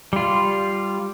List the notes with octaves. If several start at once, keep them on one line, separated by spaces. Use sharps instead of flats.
G3 F4